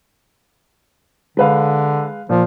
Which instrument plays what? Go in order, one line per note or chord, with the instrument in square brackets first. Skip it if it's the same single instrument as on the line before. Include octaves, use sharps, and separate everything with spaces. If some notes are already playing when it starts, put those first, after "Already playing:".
[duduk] D3 [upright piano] G#3 B4 F5
[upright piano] A#2 [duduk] F3